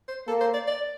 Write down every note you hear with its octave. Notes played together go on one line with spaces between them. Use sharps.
C5
A#3 A4
C5
D5
D5